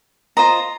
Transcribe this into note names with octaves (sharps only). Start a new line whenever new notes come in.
F4 C5 D#5 A#5